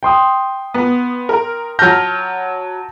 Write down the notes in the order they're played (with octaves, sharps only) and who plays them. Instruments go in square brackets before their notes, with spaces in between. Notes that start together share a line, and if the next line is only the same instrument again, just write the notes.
[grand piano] G5 C6 D#6
[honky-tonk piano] B3
A#4
[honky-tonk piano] F#3 F6 [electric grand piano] A5 G6 A#6